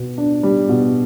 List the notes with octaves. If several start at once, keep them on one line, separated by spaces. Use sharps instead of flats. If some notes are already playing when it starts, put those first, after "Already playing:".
Already playing: B2 B3
D4
G3
B2